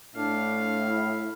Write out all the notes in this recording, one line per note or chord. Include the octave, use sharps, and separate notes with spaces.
A2 D4 F5
E4